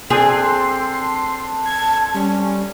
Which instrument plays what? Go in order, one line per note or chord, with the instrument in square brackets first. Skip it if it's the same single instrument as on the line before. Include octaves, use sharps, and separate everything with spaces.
[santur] C4 D4 A4 [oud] G#4 [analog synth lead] C6
[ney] A5 [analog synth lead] G#6
[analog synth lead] G3 [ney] C#4